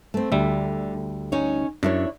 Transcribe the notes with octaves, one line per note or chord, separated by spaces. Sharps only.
A3 C4
D2 D3 G3 E5
C#4 D#4 C#5
F#2 D4 E4 C#5